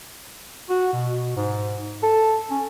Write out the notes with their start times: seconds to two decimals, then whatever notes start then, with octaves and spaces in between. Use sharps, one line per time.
0.70 F#4
0.93 B2
1.36 G#2
2.03 A4
2.51 C#4